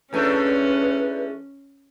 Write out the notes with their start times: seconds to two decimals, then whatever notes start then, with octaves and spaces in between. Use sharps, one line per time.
0.13 E2 A3 C#4 D4 B4